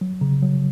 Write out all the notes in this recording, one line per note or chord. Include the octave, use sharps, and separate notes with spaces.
F#3
C#3
F#3